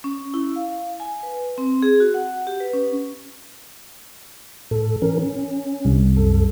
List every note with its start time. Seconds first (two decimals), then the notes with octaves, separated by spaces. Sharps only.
0.04 C#4
0.34 E4
0.56 F5
1.00 G#5
1.23 B4
1.58 C4
1.83 G#4
2.00 F#4
2.14 F#5
2.47 G4
2.60 B4
2.73 C#4
4.71 A2 A4
5.02 E3 C#4 A#4
5.19 C#4
5.85 C2
6.17 F#2 A4